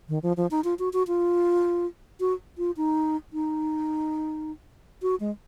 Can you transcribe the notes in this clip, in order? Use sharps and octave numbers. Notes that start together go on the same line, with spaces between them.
D#3
F3
F3
D#4
F4
F#4
F#4
F4
F#4
F4
D#4
D#4
F#4
G#3